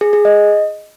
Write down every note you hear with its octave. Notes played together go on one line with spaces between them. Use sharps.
G#4
G#4
D#5